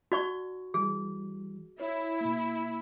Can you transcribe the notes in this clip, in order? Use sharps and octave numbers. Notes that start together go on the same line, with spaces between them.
D#4 F#4 D5 C#6
E3 G3 G#4
E4 C#5
B2 A#3